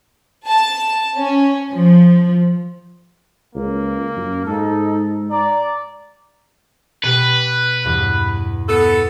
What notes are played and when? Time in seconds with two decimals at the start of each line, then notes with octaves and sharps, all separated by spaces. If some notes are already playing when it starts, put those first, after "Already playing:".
0.47 A5
1.16 C#4
1.71 F3
3.55 C#2 A#3
4.16 F#2
4.45 G#2 D#4 A4
5.31 D5 A#5
7.04 B2 G4 B4 A6
7.84 E2 G2
8.68 B3 A4